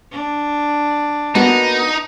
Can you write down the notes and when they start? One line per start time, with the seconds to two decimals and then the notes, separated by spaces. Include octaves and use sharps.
0.12 D4
1.35 A#3 B3 D#4 F#4